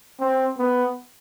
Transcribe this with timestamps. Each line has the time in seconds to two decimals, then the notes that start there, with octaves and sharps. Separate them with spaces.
0.20 C4
0.58 B3